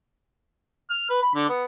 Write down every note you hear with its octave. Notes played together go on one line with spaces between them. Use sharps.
F6
B4
B5
D3
B3